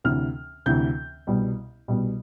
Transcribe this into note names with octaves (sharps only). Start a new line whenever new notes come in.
D2 C3 E3 F6
D2 C3 E3 G6
C2 B2 G3
C2 B2 G3